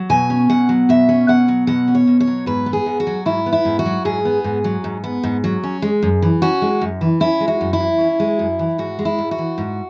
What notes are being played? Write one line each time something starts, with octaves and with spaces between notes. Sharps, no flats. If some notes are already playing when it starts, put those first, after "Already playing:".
Already playing: F#3
B2 G#5
C#4
B2 F#5
F#3
B2 E5
C#4
B2 F#5
F#3
B2 F#5
C#4
C#5
B2
C#5
F#3
G#2 B4
B3
G#4
G#2
F#4
F#3
G#2 E4
B3
E4
G#2
F#4
F#3
G#2 G#4
B3
G#2
F#3
G#2
B3
G#2
F#3
C#4
G#3
F#2
E3
C#4 F#4
G#3
F#2
E3
C#4 E4
G#3
F#4
F#2
E4
E3
C#4
G#3
F#2
E3
G#2 F#4
G#3
E4
G#2
F#4
E3
G#2